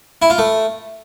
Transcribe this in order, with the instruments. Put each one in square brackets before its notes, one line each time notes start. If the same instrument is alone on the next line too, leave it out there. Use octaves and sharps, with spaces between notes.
[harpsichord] E4
F4
A3